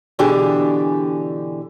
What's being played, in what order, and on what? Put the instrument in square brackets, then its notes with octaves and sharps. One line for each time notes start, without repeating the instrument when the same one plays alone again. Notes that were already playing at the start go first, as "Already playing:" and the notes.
[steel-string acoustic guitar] B2 D3 E3 D4 G4 G#4